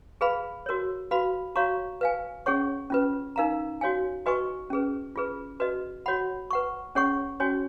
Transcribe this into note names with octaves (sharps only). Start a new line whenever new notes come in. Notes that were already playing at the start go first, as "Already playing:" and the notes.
G#4 B4 F5 B5
F#4 A#4 C#5
F#4 B4 F5 B5
F#4 C#5 F5 A#5 C#6
B4 F5 G#5
C#4 G#4 C#5 F#5 C#6
C#4 F4 B4
D#4 A#4 F5 A#5
F#4 C#5 F5 G#5
F#4 B4 D#5 G#5 C#6
C#4 G#4 B4
F4 G#4 B4
F#4 B4 D#5
F#4 C#5 F#5 B5
B4 F#5 C#6
C#4 G#4 C#5 F#5 C#6
C#4 F#4 C#5 G#5